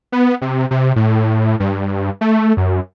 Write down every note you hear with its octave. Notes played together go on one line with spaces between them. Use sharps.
B3
C3
C3
A2
G2
A3
F#2